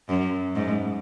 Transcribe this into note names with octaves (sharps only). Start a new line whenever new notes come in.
F#2
G#2